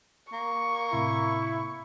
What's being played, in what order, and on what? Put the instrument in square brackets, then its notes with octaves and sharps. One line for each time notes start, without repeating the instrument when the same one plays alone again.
[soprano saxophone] A#3 [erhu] C#6
[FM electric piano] A2 C3 [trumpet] E4